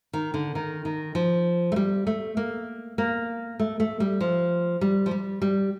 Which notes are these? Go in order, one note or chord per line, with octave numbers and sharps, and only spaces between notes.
D#3
D3
D#3
D#3
F3
A3
G3
A3
A#3
A#3
A3
A3
G3
F3
G3
F3
G3
G3